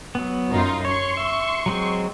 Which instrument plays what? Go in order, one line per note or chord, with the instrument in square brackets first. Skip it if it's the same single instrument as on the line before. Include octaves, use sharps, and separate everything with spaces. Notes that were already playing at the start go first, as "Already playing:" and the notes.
[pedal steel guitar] F#3 B3
[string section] F#2 D#4 F4
[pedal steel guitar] C#5 [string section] C6 C#6
[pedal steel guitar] E5
F#3 G#3 C4